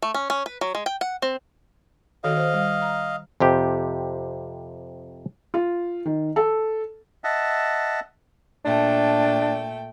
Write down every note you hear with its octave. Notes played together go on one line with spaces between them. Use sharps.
A3
C#4
C#4
B4
F#3
G#3
G5
F#5
C4
D#3 F#4 A4 D#5 F5
C5
G3
A#5
F2 C3 G4
F4
D#3
A4
D#5 E5 F#5 A5
A#2 A3 D4 G5